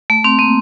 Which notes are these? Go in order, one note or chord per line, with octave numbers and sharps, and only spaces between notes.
A3
C4
A#3